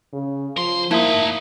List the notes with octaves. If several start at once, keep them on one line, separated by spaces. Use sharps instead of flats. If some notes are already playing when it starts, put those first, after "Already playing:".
C#3
F3 A#4 C6
A3 A#3 D#4 E4